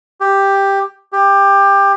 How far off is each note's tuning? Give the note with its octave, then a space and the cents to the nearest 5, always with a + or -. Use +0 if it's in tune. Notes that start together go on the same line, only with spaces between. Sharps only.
G4 +5
G4 +20